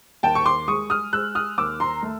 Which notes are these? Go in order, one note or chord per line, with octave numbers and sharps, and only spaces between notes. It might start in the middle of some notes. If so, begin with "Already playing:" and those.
D#2 G5 A5
C#6
C6 D6
G#3 C#6 D#6
D#6 F6
G#3 E6 F#6
D#6 F6
D#2 D6 E6
A#5 C6
A3